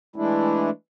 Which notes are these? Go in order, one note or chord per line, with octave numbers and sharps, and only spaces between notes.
E3 G#3 A3 D4 E4